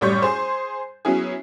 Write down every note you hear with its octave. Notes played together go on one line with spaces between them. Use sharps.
A1 F#2 G3 C#5 C#6 G6
G#4 C5
F#3 B3 C#4 E4 G#4